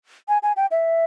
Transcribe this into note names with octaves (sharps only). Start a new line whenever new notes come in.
G#5
G#5
G5
E5